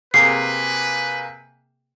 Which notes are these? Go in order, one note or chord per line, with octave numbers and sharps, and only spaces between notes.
C3 A#3 G#4 B4 C7